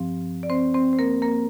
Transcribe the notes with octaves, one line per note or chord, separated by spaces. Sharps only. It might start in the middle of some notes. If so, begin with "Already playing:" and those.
Already playing: G2 F3 C4
D5
C4 C5
C4 C5
C5
A#3 A#4
A#3 A#4